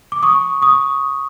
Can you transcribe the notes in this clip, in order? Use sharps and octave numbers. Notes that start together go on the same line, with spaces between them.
D6
C#6 D#6
C#6 D#6